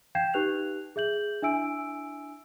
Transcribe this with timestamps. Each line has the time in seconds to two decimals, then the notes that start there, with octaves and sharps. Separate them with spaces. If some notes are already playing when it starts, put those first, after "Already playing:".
0.15 F5 G5 G6 G#6 C7 E7
0.34 D#4 G4 B4 F#6 F7
0.96 G#4 E5 G6 F#7
1.42 D4 E4 E5 G#5 E6 D7